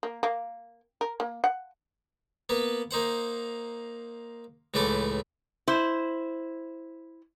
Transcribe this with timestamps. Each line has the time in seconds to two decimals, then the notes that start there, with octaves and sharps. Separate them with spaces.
0.03 A#3
0.23 A#3
1.01 A#4
1.20 A#3
1.44 F#5
2.49 A#3 B3 B4
2.91 A#3 D#4 C5 F#5
4.74 C#2 A2 E3 A3 A4 D6
5.68 E4 C5